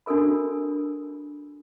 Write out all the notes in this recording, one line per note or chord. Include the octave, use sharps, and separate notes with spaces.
D4 F#4 A4 A#4 B5